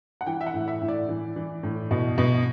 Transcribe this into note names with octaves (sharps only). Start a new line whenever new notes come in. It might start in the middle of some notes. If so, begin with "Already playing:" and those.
F#5
E3 G5
E5
F#5
A2
E5
A2
D5
E3
E3
A2
B2
B2